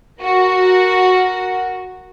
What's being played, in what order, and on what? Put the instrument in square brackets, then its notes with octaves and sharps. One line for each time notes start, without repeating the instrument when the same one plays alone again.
[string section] F#4 A#4